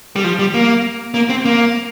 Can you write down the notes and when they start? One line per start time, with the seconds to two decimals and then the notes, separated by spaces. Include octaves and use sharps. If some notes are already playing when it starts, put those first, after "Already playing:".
0.16 G3
0.24 F3
0.39 G3
0.54 A#3
1.14 A#3
1.30 C4
1.45 A#3